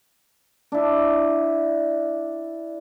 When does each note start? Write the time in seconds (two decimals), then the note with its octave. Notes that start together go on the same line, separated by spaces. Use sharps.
0.72 D4 E4